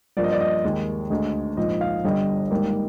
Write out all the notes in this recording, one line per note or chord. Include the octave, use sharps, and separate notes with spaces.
G2 F3 A#3 D5
D#5
D5
D#5
D#2 D#3 G#3
D2 D3 G#3
A#1 G#2 F3 D#5
F5
G1 G2 D3 G3 D#5
G#1 G#2 G3 A#3